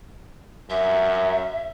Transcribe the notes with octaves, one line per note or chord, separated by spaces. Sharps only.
F#2 E5